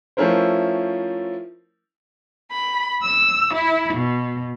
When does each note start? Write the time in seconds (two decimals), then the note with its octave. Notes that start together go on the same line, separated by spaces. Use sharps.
0.17 F3 A3 C#4 E4 A#4 C5
2.51 B5
3.02 E6
3.53 E4
3.94 B2